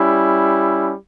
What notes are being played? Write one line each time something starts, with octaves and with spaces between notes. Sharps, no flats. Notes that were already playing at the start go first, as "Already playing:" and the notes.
Already playing: G3 C#4 E4